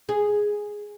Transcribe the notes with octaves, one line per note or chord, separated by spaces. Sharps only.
G#4